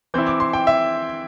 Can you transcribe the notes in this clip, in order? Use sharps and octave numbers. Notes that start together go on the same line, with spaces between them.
E3 C4 E4 G6
D6
C6
G5
E5